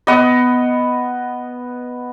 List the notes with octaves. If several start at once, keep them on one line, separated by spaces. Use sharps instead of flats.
B3 D#5